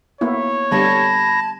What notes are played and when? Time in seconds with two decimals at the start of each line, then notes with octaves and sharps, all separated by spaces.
0.21 A#3 B3 E4 C#5
0.71 D3 G3 B3 A5 B5 G#6 A#6